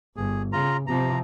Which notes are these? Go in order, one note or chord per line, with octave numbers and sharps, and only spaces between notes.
G1 G#4
C#3 F4 A#5
C3 F3 A#5